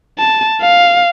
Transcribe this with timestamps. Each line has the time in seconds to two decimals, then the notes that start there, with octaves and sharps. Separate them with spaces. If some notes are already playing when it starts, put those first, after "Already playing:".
0.19 A5
0.62 F5